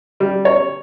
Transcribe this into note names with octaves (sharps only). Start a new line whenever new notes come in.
G3
C#5